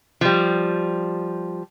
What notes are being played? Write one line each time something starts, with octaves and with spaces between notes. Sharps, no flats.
F3 G3